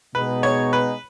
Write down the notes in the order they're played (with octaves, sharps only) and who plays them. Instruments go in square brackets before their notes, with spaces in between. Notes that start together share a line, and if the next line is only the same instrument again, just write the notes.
[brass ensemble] B2 G#3 B3 D#4 G#4 [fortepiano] B4
[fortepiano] C#5
B4